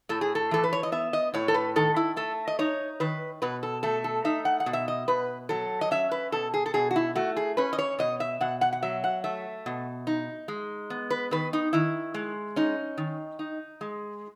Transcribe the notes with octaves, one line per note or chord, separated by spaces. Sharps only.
A2 A4
G#4
A4
E3 A4
B4
C#5
D#5
B3 E5
D#5
A2 C#5
A4
B4
D#3 A4
E4
A3 A4
D#5
D#4 C#5
D#3 B4
B2 B4
A4
A3 A4
A4
D#4 E5
F#5
F#5
B2
E5
D#5
B2 B4
F#3 A4
D#5
C#4 E5
B4
B2 A4
G#4
A4
B2 G#4
F#4
E4
A3 F#4
G#4
C#4 B4
D#5
C#5
B2 D#5
E5
B2 F#5
F#5
F#5
F#3 E5
F#5
A3 E5
B2
D#4
G#3
B3
B4
D#3 B4
D#4
D#3 E4
G#3
C#4 D#4
D#3
D#4
G#3